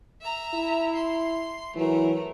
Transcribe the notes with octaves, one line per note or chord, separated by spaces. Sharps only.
E5 A#5
E4
C6
E3 F#3 A3 A#4